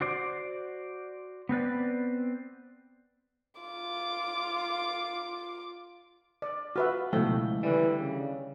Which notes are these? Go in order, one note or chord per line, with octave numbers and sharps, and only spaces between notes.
F#4 C5 D5
B3 C4 B4 D5
F4 D6
D5
F4 F#4 B4 E5
C#2 B2 F3 A3 E4 G5
D3 E3 G3
C#3